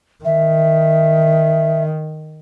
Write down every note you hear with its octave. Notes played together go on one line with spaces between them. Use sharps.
D#3 E5